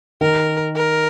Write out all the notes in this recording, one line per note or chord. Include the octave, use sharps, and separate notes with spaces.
D#3 A#4
A#4